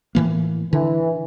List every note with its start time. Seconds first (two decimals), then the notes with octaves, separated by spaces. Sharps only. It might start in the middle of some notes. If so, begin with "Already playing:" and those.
0.15 A2 E3 A#3
0.73 D3 E3